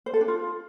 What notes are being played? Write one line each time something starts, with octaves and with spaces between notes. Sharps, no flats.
C5
A4
D4
F4